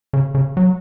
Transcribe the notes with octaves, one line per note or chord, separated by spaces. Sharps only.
C#3
C#3
F#3